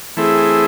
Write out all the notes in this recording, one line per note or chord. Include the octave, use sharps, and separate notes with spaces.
E3 A3 C4 E4 G#4